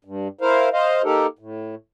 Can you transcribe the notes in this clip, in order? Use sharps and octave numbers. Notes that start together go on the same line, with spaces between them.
G2
E4 A#4 C5 F5
C5 D#5 F5
A#3 D#4 G4 A4 A#4
A2